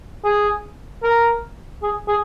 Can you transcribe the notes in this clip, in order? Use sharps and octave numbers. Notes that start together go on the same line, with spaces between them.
G#4
A#4
G#4
G#4